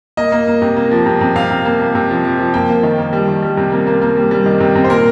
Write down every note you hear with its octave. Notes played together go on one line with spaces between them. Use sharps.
A#3 D#5
A#3
A#3
C3
A#3
F3
C3
C3
C3 F5
C3
A#3
A#3
C3
F3
F3
F3
A#3 G5
A#3
D#3
A#3
G3
D#3
G3
C3
A#3
A#3
A#3
G3
G3
D#3
C3
C3
C5
A#2 A#4